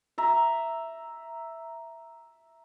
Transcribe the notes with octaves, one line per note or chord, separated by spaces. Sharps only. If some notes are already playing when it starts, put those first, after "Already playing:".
E5 A#5